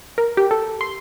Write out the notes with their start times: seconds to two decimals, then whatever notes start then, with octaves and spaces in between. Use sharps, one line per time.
0.18 A#4
0.37 G4
0.51 A4
0.81 C6